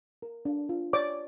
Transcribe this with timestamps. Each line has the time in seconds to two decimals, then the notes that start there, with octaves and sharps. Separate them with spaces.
0.22 A#4
0.45 D4
0.69 F4
0.93 C#5 D5 D6